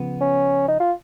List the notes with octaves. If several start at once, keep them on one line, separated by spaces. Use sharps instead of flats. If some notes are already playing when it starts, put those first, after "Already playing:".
Already playing: C#3 F3 B3
C#4
D#4
F4